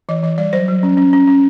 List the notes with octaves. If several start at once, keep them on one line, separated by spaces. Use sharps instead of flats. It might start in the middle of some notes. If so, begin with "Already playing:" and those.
E3 D#5
E3 D#5
G3 D5
F#3 C5
F#3
C#4
C#4
C#4
C#4